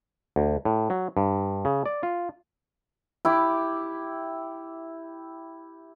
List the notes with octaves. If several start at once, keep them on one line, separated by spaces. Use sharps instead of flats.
D2
A2
F#3
G2
C#3
D5
F4
E4 G4 D6